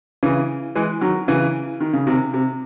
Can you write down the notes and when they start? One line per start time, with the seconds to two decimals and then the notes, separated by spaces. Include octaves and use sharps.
0.23 C#3 E3
0.76 E3 G#3
1.01 D#3 F#3
1.28 C#3 E3
1.80 D#3
1.93 C#3
2.07 C3 D#3
2.34 C3